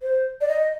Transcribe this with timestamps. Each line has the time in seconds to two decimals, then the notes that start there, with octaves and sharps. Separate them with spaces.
0.03 C5
0.41 D5
0.48 D#5